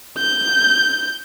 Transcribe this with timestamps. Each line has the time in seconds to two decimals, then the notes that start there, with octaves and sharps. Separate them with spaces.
0.18 G6